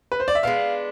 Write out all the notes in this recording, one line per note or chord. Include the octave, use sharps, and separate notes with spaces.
B4
C5
D5
E5
G#3 B3 D4 F5